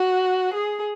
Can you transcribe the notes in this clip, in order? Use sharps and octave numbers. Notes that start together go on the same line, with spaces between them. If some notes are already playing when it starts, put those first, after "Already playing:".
Already playing: F#4
G#4